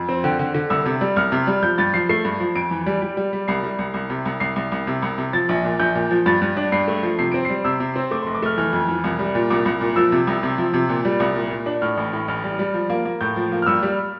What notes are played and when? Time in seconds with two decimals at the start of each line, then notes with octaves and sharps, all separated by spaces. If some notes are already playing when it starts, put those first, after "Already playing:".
Already playing: F2
0.09 C4
0.24 D3 G5
0.39 D3
0.54 D3
0.70 C2 E6
0.86 C3
1.01 G3
1.16 C2 F6
1.32 C3
1.47 G3
1.63 F3 G6
1.78 G2 A6
1.94 F3 C7
2.09 A3 C7
2.25 G2
2.40 F3
2.55 F2 D7
2.71 E3
2.86 G3
3.02 G3
3.17 G3
3.33 G3
3.48 C2 C7
3.63 G3
3.79 C2
3.94 C2
4.10 C3
4.25 C2
4.40 C2 C7
4.56 C2
4.72 C2
4.87 C3
5.02 C2
5.18 C3
5.33 F3 A6
5.49 A#1
5.64 A#2
5.80 A#1 G6
5.95 A#2
6.11 F3
6.26 G2 A6
6.42 G2
6.57 D4
6.72 G2 C7
6.88 A3
7.03 F3
7.19 C3 C7
7.32 C4 D7
7.45 G3 C7
7.65 C3 E6
7.80 C3
7.96 C4
8.11 A3 D6
8.23 C6
8.26 F1
8.35 D6
8.42 A3 F6
8.58 E3 F6
8.73 F2
8.88 E3
9.04 C2
9.19 G3
9.35 A#2
9.50 C2 D6
9.65 C2
9.81 A#2
9.96 F3 E6
10.12 C3
10.27 C2
10.43 C3
10.58 F3
10.74 C3
10.89 A#2
11.05 G3
11.20 C2
11.35 A#2
11.51 A#2
11.66 D4
11.82 A2 F6
11.97 A1
12.13 A2
12.28 A1 F6
12.44 G3
12.59 G3
12.74 F3
12.90 A#3
13.05 A#3
13.21 A2 G6
13.36 F3
13.52 A#3
13.62 F6
13.66 G2 E6
13.83 G3